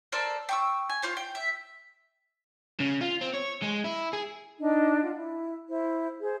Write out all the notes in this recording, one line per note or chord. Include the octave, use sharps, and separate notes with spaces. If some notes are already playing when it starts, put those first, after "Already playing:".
A4 A#4 C5 D5
G5 C#6 E6
G#5
F4 C5 C#5
G5
E5
C#3
F4
C4
C#5
G#3
E4
G#4
D4 D#4 D#5
F4 F#5
E4
E4 C5
G#4 C5